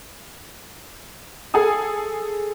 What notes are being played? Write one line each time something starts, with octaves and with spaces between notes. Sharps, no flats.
G#4 A4 G#5 D#6